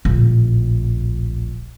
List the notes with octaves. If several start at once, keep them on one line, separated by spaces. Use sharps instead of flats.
D1 A#1